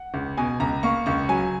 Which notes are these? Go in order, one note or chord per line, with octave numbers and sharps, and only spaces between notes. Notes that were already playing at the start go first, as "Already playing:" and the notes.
Already playing: F#5
C#2
B2 G#5
C#2 A#5
A#3 C#6
C#2 C#6
F#3 G#5